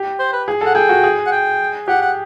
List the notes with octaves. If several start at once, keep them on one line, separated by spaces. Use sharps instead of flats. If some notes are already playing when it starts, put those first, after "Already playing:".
Already playing: G4
C5
B4
G#4
A4
F#5
G#4 G5
F#4
G#4
F#5
G5
G4 F#5
F#5